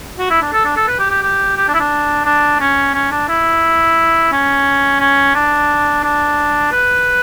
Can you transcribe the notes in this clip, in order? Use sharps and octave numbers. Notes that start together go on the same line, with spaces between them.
F#4
E4
D4
A4
D4
A4
B4
G4
G4
G4
G4
D4
E4
D4
D4
C#4
C#4
D4
E4
C#4
C#4
D4
D4
B4